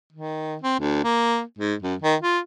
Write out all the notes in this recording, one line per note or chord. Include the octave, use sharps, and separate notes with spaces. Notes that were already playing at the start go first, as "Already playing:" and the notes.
D#3
C4
D2
A#3
G#2
F#2
D#3
F4